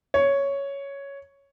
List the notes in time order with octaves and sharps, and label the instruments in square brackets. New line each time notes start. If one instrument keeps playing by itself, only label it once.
[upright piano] C#5